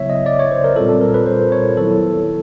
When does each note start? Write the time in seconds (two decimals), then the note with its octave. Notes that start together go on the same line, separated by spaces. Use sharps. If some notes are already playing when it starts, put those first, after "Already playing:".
Already playing: C#3 F#3 B3 E4 C#5 E5
0.10 D#5
0.26 D5
0.39 C#5
0.52 C5
0.64 A#4
0.76 A#2 G3 C4 F4 A4
0.89 A4
1.01 A#4
1.14 B4
1.26 C5
1.52 C#5
1.77 D#3 F#3 B3 E4 A4